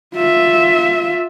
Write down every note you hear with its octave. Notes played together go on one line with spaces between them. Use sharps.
F4 E5